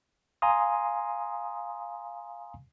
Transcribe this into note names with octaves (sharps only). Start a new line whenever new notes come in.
F5 G#5 A#5 C6 D#6